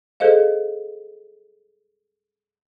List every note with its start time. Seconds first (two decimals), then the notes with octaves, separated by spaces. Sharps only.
0.20 G#4 A4 C5 D#5 F5